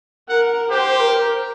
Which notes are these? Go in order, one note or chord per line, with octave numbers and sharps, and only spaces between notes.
A#4 F#5
G4 C5
A#4